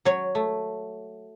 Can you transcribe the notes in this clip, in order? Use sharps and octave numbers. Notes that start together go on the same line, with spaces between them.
F#3 C#5
A3